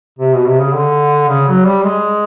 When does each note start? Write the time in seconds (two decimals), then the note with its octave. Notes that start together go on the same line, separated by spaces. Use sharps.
0.19 C3
0.34 B2
0.47 C3
0.61 C#3
0.74 D3
1.29 C#3
1.48 F#3
1.66 G3
1.84 G#3